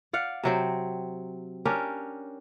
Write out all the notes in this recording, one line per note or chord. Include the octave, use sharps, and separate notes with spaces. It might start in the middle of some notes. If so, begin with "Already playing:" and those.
D5 F5 F#5
C3 F#3 C4
C#4 D4 G4 A#4